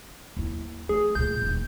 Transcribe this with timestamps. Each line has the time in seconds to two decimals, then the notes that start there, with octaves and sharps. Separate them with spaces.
0.37 D#2 E4
0.89 A3 G#4
1.15 D2 A#2 G6
1.42 D#1 D#4